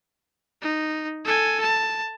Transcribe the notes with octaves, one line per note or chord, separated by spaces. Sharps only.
D#4
A4 G#5
A5